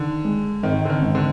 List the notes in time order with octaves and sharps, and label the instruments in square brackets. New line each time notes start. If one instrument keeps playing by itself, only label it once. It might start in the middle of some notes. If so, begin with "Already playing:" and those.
Already playing: [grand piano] D3 [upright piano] D#3
[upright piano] G#3
[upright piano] G#1 [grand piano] D#3
[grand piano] D3
D#3
[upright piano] G#2
[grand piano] D3